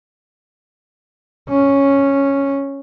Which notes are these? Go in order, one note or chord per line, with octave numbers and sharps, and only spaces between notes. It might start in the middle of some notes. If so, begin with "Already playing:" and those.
C#4